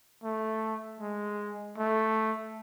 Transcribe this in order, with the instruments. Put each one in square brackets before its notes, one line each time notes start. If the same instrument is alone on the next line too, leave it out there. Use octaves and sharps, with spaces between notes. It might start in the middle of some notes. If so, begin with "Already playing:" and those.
[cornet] A3
G#3
A3